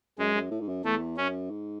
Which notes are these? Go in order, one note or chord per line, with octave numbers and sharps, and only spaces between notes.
F#2 G#3
F#2
A2
G#2
F#2
E2 A3
F#2 C#4
G#2